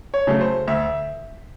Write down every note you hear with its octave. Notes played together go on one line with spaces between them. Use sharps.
C#5
C#3 F#3 A3
C5
D2 E5